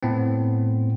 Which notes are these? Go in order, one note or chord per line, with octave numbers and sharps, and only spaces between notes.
A2 B3 C4